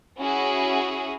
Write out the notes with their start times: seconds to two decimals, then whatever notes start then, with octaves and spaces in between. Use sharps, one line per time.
0.18 C#4 E4 F#4 G#4